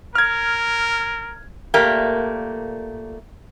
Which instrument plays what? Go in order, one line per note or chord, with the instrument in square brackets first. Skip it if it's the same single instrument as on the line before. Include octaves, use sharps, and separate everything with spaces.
[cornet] A#4 [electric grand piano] F6 G#6
[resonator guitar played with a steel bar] A#2 A3 A#3 G4